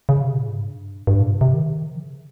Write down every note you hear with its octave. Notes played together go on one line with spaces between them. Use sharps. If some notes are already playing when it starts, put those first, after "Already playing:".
C#3
C3
A#2
G#2
G2
G2
A#2
C3
C3
D#3
F3
D#3
C#3